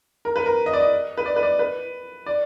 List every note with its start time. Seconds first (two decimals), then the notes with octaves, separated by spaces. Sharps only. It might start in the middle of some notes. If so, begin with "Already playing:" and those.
0.25 A#4
0.36 B4
0.46 A#4
0.66 D#5
0.73 D5
0.80 D#5
1.18 B4
1.26 D5
1.36 B4
1.43 D5
1.59 B4
2.26 D5